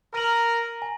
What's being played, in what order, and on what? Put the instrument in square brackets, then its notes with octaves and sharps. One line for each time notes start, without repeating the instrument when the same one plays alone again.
[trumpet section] A#4 [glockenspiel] A#5 F6 A#6 D#7 F#7
[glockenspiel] G#5